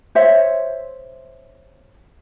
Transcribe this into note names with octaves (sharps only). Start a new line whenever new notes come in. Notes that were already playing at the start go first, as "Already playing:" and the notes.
C5 C#5 E5 F#5